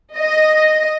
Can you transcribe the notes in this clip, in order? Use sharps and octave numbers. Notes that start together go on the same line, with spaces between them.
D#5